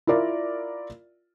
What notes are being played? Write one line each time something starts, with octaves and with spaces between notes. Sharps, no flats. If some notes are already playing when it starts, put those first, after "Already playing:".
E4 F4 A#4 D5 E5